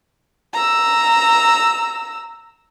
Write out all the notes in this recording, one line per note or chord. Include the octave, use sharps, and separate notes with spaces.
A#5 E6